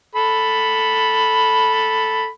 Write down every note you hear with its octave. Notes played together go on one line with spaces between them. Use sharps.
A4 B5